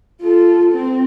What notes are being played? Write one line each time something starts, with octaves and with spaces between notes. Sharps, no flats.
F4 A4
C4